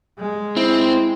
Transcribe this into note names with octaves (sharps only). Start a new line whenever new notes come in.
G#3
C4 E4